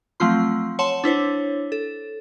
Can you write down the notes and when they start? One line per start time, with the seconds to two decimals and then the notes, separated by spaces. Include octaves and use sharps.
0.20 F3 F#3 A3 C4 F4 C6
0.79 C#5 F#5 A5 C6 E7
1.04 D4 E4 C5 C#5
1.72 A4